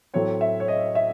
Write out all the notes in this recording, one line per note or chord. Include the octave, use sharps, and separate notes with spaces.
A2 F#3 A3 C4 C#5
E5
C#5
D#5
E5